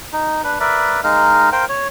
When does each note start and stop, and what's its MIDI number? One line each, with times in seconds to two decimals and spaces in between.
0.13 0.42 63
0.44 0.59 62
0.44 0.59 71
0.60 1.01 70
0.60 1.01 71
0.60 1.01 74
0.60 1.01 76
1.04 1.50 56
1.04 1.50 63
1.04 1.50 70
1.04 1.50 77
1.52 1.65 70
1.52 1.65 72
1.52 1.65 77
1.52 1.65 79
1.69 1.88 73